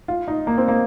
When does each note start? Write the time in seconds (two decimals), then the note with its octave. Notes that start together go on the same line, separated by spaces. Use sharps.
0.08 F4
0.28 D#4
0.47 A#3
0.58 C4
0.68 A#3